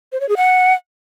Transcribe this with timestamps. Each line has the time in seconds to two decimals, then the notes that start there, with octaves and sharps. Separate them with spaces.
0.12 C5
0.21 C#5
0.29 G#4
0.37 F#5